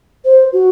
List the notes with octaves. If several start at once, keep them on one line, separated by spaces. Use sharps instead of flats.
C5
F#4